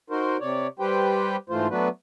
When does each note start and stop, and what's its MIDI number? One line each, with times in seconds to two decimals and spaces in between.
0.10 0.37 63
0.10 0.37 66
0.10 0.37 70
0.10 0.37 72
0.40 0.67 48
0.40 0.67 73
0.40 0.67 74
0.79 1.36 55
0.79 1.36 67
0.79 1.36 71
0.79 1.36 72
0.79 1.36 79
1.50 1.67 44
1.50 1.67 52
1.50 1.67 57
1.50 1.67 65
1.50 1.67 72
1.70 1.89 54
1.70 1.89 57
1.70 1.89 59
1.70 1.89 62
1.70 1.89 66
1.70 1.89 71